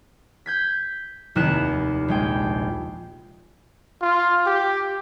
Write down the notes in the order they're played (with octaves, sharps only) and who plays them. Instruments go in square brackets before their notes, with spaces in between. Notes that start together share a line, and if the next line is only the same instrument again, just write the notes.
[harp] G6 G#6 B6
F1 D#2 E4 A#4 F#6 E7
A#1 G#3 G5
[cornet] F4
G4